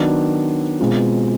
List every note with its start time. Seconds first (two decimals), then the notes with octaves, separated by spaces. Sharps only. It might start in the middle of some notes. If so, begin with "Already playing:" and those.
Already playing: D#3 F#3 B3 D4
0.80 B2 G#3 C4 F4